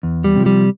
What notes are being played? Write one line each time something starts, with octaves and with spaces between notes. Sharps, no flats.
E2
G3
C3 F3
G3